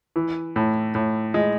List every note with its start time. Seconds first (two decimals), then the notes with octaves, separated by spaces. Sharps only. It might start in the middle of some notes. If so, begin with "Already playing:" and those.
0.16 E3
0.56 A2
0.95 A2
1.34 G#3